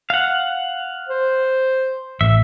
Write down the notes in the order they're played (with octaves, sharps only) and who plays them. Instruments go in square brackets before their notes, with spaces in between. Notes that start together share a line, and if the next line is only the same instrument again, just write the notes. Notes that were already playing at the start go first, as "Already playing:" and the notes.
[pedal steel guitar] F5 F#5
[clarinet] C5
[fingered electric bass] A1 [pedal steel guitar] E5